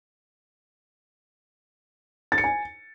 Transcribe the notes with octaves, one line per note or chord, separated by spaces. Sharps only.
A6
C#7
G#5